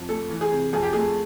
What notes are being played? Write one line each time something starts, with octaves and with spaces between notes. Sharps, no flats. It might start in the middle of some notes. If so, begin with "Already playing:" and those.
Already playing: F2
A3 A4
E3
G#4
C3
F2 G#4
G4
A3 G#4